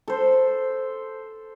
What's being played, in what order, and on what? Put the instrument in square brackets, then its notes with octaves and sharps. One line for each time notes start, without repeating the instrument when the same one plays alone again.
[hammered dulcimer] A4 C5